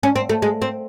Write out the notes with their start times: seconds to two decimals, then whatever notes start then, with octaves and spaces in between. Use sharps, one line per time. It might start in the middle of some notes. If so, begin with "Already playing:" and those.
0.03 C#4
0.16 C4
0.29 A3
0.42 G#3
0.62 C4